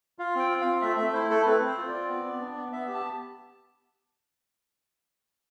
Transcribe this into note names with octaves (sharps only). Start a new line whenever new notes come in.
F4 F5
C4 G5
F4
C4 F5
A3 E5
A3 E5
E4 C5
A3 A4
C4 B4
C4
C5
F4
D5
C4
B3
B3
D4
B3
B3 E5
G4
A5